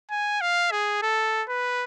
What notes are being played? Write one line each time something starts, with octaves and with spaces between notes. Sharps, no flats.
G#5
F5
G#4
A4
B4